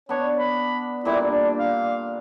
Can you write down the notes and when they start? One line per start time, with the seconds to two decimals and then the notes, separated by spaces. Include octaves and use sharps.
0.09 B3 D4 C#5
0.39 B5
1.05 A#2 D3 G3 E4
1.25 D4
1.59 F5